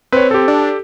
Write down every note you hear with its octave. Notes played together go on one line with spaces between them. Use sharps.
C4 B4 C#5
G4 A4
D4